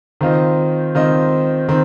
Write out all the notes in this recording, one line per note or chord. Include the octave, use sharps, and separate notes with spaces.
D#3 C4 F4 C5 D#5
D#3 C4 F4 C5 D#5
D#3 C4